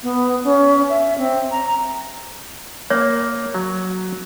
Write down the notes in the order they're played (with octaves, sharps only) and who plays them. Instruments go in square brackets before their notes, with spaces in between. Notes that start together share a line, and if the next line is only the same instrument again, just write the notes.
[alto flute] B3
C#4
E5
C4
A#5
[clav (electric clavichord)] A#3 [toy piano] C#5
[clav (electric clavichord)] F#3